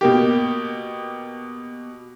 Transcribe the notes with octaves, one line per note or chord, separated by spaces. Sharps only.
B2 A#3 G4